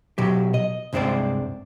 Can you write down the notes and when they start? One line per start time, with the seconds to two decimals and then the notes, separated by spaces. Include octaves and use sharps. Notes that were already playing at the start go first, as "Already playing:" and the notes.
0.18 B2 F#3 G4
0.54 D#5
0.93 C2 G2 G#3 C4 C5 D5